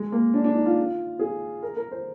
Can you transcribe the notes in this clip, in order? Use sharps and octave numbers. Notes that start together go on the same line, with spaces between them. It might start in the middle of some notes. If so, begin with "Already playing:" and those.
Already playing: G#3
A#3
D4
D4
D#4
F4
G#4
A#4
A#4
C5